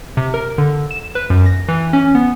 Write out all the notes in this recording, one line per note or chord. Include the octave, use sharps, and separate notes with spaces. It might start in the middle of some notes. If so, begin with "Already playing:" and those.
C3
A#4
D3
E7
B4
F#2
A#6
E3
C#4
B3